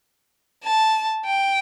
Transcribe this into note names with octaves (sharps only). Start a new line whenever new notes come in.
A5
G5